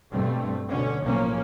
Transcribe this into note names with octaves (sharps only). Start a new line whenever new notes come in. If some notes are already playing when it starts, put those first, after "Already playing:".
G2 B2 A3 C4
D2 B2 D3 C#4
B1 A2 F3 A#3 C#4